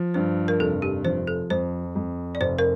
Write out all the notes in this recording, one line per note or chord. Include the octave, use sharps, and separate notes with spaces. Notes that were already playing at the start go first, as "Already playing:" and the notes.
Already playing: F3
G2 C5
A#4
F1 A4
G4
F3 C5
A4
F2 C5
F2
D5
F1 C5
A#4